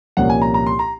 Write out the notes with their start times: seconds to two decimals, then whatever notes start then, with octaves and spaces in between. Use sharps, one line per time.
0.17 C2 A#2 F3 A#3 C#4 F#5
0.30 G#5
0.42 A#5
0.54 A#5
0.66 C6
0.79 A#5